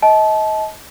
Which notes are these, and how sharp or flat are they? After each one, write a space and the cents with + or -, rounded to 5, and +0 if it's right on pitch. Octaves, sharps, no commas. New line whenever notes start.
D#5 +30 A5 -25